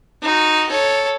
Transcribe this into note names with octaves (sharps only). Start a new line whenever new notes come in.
D#4 F#4
A4 C#5